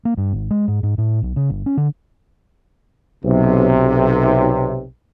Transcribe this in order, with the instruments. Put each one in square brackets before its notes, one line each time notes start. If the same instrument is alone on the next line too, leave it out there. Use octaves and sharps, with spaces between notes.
[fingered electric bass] A#3
G2
G#1
G#3
G#2
G#2
A2
B1
C#3
G1
C#4
D3
[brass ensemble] B1 C3